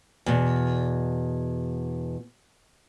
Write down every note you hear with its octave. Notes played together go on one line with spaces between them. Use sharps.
E2 B2